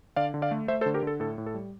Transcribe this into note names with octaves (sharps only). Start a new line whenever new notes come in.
D3 D5 F5
D3
D5 F5
A3
A3 C5 E5
A4 C5
D3
G4 A#4
D3 A4
A2 A4
A2
A4
G3